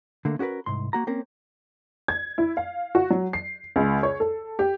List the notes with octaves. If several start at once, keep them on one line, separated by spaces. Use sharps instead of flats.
D3 A3 A#3
C#4 F#4 G4 A#4 B4
C2 G#2 C6
A#3 F#4 A#5
A#3 C4 C#4 A#4
G#6
E4
F5
F#4
F#3
C7
C#2
C#5
A4
G4